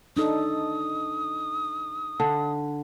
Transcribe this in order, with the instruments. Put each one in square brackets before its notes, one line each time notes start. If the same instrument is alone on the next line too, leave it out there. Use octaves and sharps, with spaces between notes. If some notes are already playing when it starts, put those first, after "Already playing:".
[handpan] D4 D#4 A4 [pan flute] D#6
[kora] D3